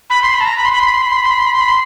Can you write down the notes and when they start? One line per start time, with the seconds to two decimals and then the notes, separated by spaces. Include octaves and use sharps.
0.10 B5
0.22 C6
0.34 B5
0.40 A5
0.46 A#5
0.57 B5
0.65 C6
0.72 B5
0.80 C6
0.87 B5
0.94 C6
1.02 B5
1.09 C6
1.17 B5
1.23 C6
1.31 B5
1.38 C6
1.46 B5
1.53 C6
1.61 B5
1.68 C6